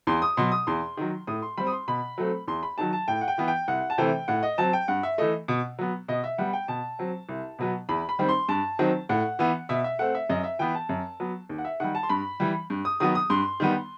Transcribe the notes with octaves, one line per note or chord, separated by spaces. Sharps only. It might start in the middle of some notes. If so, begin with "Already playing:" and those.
E2 C6
D#6
B2 F#3 C6
D#6
E2 C6
D#3 F#3
A2 D#6
C6
G3 C4 B5
D#6
C6
B2 B5
F#3 A3 C4
E2 C6
B5
D#3 F#3 A5
A5
A2 G5
F#5
G5
E3 B3
G5
C2 F#5
A5
C3 E3 A3 C4 G5
A2 F#5
D#5
F#3 C4 A5
G5
G2 F#5
E5
E3 A3 D#5
B2
F#3 B3
B2 D#5
E5
G3 B3 F#5
G5
B2 A5
F#3 C4
C2
B2 F#3 B3
E2 B5
B5
D#3 G3 C4
C6
G2 A5
D#3 F#3 C4
A2 F#5
E3 B3
B2 E5
E5
A3 C4 F#5
E5
F#2 D#5
E5
E3 B3 G5
A5
F#2
F#3 B3
D#2
F#5
E5
D#3 G3 F#5
A5
C6
G2 B5
E3 G3
G2
D#6
D#3 F#3 B3 D#6
D#6
G2 C6
D#3 G3 B3